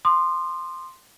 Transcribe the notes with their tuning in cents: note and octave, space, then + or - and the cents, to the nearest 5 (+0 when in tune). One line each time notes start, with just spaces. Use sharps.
C6 +0 D#6 -45